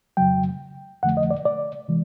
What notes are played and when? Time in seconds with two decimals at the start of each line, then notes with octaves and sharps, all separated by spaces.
0.17 F2 C#3 F#3 G5
1.03 F2 D3 F3 A3 F#5
1.17 D#5
1.30 D5
1.45 D5
1.88 C3 E3 G#3